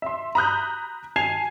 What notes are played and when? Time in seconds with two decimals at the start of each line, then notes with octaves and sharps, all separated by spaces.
0.02 E5 C6
0.35 A#5 B5 D#6 F#6 G6
1.16 G#5 A5 G#6 C7 F7